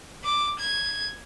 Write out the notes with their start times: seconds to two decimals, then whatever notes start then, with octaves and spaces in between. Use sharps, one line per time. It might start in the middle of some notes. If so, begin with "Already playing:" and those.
0.24 D6
0.59 G#6